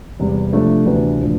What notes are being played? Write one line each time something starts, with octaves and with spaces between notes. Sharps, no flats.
E2 C3 G3
C3 F3 A3 D4
D2 C3 E3 B3 D4
A2 F3 B3 D4